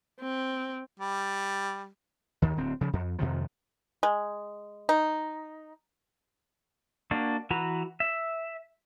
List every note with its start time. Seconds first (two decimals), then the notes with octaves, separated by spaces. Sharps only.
0.21 C4
0.99 G3
2.42 D#2 D#3
2.57 D1 C4
2.81 C#3 F3
2.93 F2
3.19 F2 C3 D#3 F3
4.03 G#3
4.89 D#4
7.11 A#3 D4 F#4
7.51 E3 F#4 B4 A#5
8.00 E5